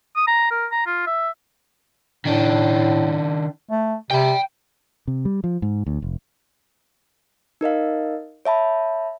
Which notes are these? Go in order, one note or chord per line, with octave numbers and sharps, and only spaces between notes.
D#6
A#5
A#4
A#5
F4
E5
A2 D#3 D4
A3
C3 G5 B5
C3
G3
F3
G#2
D2
F1
D#4 A#4 D#5 F5
C#5 E5 A5 B5